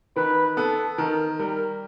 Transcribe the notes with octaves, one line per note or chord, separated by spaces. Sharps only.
D#3 B4
B3 A4
D#3 A#4
G3 A#4